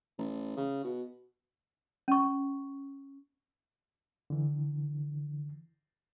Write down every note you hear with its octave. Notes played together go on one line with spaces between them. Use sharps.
A1
C#3
B2
C#4 C#6
D3 E3